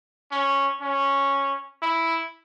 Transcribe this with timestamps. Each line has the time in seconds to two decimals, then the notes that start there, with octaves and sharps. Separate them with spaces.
0.31 C#4
0.81 C#4
1.82 E4